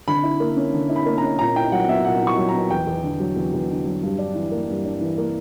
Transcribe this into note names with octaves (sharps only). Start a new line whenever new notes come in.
D3 B5
E4
A#3
C#4
D3
E4
B5
A#3
C#4 A#5
A#2 A#5
E4 G5
F#3 F#5
B3 E5
A#2 F#5
E4
C#6
F#3
A#5
B3
E2 G5
E2
D3
F#3
E2
E2
D3
F#3
G2
D4
E3
A#3
G2
D4
E3
A#3